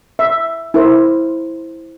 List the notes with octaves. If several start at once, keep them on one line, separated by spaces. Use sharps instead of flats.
E5
E4 A#4 C5